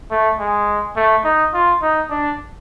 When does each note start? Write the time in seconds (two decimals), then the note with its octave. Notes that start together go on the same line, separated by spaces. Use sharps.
0.11 A3
0.39 G#3
0.96 A3
1.25 D#4
1.54 F4
1.82 D#4
2.10 D4